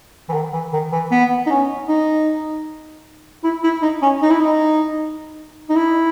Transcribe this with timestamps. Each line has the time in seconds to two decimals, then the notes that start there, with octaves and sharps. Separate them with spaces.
0.29 E3
0.33 D#3
0.53 E3
0.73 D#3
0.92 E3
1.11 B3
1.46 D#4
1.50 C#4
1.88 D#4
3.44 E4
3.63 E4
3.82 D#4
4.02 C#4
4.22 D#4
4.31 E4
4.40 D#4
5.69 D#4
5.76 E4